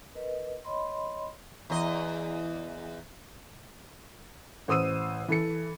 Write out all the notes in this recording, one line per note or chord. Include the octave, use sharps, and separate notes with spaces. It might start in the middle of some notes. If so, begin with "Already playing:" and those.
A#4 B4 D#5
C#5 D#5 B5 C6
E2 D#5
A1 C5 D#6 E6 D#7
E3 A4 C#7